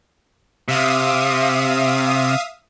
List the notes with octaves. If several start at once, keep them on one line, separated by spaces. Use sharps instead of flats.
C3 E5 F5 D#6